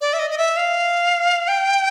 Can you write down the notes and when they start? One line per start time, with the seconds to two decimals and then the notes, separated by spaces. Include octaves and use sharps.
0.01 D5
0.13 E5
0.19 D#5
0.31 D#5
0.38 E5
0.57 F5
1.48 G5